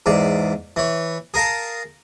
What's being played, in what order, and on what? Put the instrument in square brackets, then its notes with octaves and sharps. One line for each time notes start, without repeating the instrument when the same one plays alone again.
[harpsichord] E2 G#2 D5
E3 C#5
G#4 A#4 F5 A5